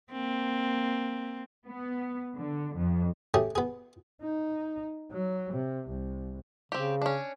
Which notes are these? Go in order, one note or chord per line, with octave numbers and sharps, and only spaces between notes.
A#3 C4
B3
D3
F2
A3 C#4 G4 G#4
B3 G#4
D#4
F#3
C3
C2
C#3 C4 G4
C#4 D4